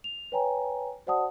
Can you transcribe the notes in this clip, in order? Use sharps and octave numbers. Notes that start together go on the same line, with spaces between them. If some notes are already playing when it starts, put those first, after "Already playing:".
F7
B4 C#5 G5 G#5 A#5
F#4 C5 D5 F#5 A5 D#6